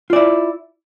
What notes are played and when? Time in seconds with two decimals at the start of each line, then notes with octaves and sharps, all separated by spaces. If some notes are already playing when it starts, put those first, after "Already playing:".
0.10 F4
0.13 D5
0.16 E4